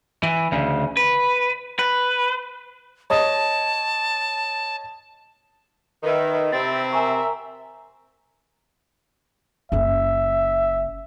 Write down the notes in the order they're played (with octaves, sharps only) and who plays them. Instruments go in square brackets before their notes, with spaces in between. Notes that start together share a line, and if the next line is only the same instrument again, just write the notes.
[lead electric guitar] E3
D2 C#3
B4
B4
[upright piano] C#5 D#5 D#6 [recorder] A5
[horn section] D#3 [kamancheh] B4 E5
[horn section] C3 C4 [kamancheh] E5 B5 [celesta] A6
[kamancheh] A#4 E5 [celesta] G#5 A#5 C#6
[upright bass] F#1 C#4 [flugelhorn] E5